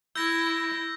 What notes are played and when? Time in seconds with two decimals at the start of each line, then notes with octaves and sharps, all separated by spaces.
0.15 E4 E6 G6 A#6